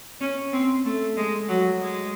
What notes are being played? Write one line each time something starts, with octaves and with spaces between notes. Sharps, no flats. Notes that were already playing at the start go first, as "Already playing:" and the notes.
C#4
C4
A3
G#3
F#3
G#3